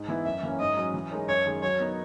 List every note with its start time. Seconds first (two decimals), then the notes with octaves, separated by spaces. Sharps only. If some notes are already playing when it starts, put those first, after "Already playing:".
Already playing: G#2
0.08 E3 B3 E4 B4
0.25 F#2 E5
0.43 E3 A#3 C#4
0.59 G#2 D#5
0.77 F#3 C#4
0.94 E3
1.11 G#3 D#4 A#4 C#5
1.28 F#2 C#5
1.45 D#3 G#3
1.63 F#3 C#5
1.80 B3 D#4 A#4